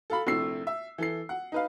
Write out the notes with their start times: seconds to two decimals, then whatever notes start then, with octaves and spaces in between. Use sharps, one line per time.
0.10 A4 F5 B5
0.27 A#1 C3 A3 E4 E6 C7
0.67 E5
0.98 E3 A4 C7
1.29 F#5
1.52 D#4 B4 F5